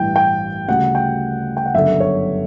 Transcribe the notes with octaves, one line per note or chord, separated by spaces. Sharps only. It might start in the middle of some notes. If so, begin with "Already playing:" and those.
Already playing: A1 G2 E3 G5
G5
D2 C#3 G3 F#5
G5
G5
F#5
G1 F#2 D3 A3 E5
C#5